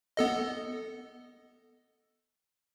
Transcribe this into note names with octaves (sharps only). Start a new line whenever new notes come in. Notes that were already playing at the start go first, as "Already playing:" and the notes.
B3 A4 D#5